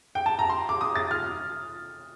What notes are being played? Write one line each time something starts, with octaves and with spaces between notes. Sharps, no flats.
G5
A5
A#5
C6
D6
D#6
A6
F6